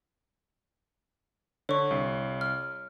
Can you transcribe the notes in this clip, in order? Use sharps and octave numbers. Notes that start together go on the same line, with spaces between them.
D3 C#5 C#6
C2
F6